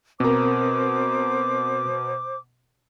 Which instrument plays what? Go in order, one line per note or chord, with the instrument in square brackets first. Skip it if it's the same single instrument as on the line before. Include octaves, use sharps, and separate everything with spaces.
[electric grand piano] B2 A#5 [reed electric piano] C4 A#4 [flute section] C5 D6